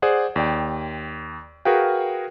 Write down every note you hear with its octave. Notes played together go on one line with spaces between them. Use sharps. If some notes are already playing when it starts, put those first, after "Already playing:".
G#4 C5 D5 F#5
D#2 D5 G5
F#4 G#4 A#4 B4 F5 G5